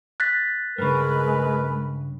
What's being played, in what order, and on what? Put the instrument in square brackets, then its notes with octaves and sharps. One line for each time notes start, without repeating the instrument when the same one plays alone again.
[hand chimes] F#6 A6 B6
[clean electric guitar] G2 C#3 [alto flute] G#3 [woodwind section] A#4 B4